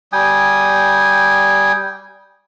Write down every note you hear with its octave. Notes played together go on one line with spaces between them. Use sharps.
G3 G5 G#5 D#6